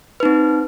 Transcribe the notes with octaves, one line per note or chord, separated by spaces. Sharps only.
C4 D#4 B4